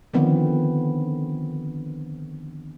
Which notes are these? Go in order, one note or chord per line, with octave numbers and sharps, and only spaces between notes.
D3 D#3 F3 B3 C4